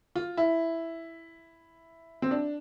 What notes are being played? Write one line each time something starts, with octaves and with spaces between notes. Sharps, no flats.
F4
E4
C4
D4